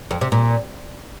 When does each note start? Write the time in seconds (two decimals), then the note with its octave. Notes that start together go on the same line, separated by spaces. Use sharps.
0.11 F2
0.21 C3
0.32 A#2